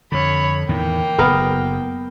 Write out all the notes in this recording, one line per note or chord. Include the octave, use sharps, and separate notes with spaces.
F2 D3 C#5 B5
E2 A2 D#3 A#3 G5
F#1 B3 A#4